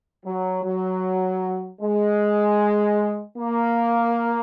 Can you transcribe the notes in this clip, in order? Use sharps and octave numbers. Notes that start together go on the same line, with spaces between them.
F#3
F#3
G#3
A#3